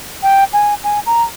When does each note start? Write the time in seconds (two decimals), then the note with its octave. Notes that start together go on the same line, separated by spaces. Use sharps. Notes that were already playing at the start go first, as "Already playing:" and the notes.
0.23 G5
0.53 G#5
0.84 G#5
1.06 A#5